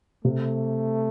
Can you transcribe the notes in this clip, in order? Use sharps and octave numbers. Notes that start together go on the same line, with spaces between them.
C3 A3